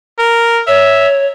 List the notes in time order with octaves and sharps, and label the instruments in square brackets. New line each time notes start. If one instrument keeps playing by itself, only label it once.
[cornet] A#4
[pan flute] C#5 [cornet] E5